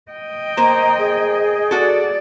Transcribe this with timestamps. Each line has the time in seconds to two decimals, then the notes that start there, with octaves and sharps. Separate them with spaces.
0.12 D#5 G5
0.57 A#3 C5 A#5
0.99 G#4
1.71 F#4 A4 D5